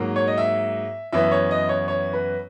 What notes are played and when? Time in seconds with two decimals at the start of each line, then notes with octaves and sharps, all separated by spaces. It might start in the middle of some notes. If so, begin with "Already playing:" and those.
Already playing: G#2 F#3 A#3
0.16 C#5
0.27 D#5
0.38 E5
1.13 F#2 E3 B3 E5
1.32 C#5
1.51 D#5
1.69 C#5
1.88 C#5
2.13 B4